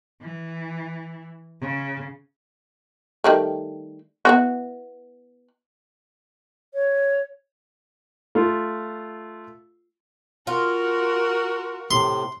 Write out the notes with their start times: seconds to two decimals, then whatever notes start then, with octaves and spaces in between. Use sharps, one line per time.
0.22 E3
1.61 C#3
3.24 D#3 G3 A3
4.25 B3 E4 F#4
6.74 C#5
8.35 A3 F4
10.47 F4 F#4 A#4
11.91 A2 C3 C6